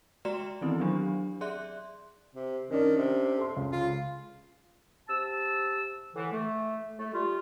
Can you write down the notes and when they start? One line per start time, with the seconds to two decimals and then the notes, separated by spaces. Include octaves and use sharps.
0.25 G#3 F#4 D5 A#5 C6 E7
0.61 D#3 E3 B3 C4 E4
0.80 F#3 C4 D4 G4
1.41 G#4 D5 E5 C6 F#6
2.35 C3
2.71 D#3 C#4 D4
2.96 C3
3.38 A4 C6
3.57 C#2
3.72 F4
5.09 C3 A5 E6
6.16 A2 D3 E3
6.32 A3
6.99 A3
7.13 G3 F4